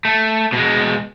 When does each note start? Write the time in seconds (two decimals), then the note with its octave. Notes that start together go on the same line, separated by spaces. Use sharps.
0.05 A3
0.53 B2 G#3